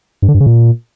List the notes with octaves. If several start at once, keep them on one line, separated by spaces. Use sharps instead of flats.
G2
D3
G2
C#3
A#2